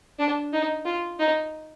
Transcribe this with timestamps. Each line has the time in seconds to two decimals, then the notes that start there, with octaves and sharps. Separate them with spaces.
0.19 D4
0.53 D#4
0.85 F4
1.19 D#4